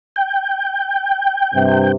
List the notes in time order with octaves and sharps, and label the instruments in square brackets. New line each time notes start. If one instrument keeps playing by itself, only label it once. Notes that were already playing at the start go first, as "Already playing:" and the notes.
[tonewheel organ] G5
[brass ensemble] G2 C3